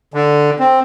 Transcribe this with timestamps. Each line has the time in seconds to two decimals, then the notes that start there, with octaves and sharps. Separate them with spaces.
0.14 D3
0.59 C4